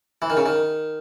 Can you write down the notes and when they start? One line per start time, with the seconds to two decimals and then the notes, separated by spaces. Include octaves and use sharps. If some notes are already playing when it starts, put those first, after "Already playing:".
0.22 E3
0.30 D#3
0.37 C#3
0.46 D#3